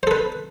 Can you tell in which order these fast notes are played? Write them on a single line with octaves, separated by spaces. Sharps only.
C5 A4 B4